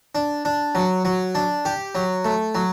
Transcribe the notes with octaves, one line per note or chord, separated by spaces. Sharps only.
D4
D4
F#3
F#3
D4
G4
F#3
A3
F#3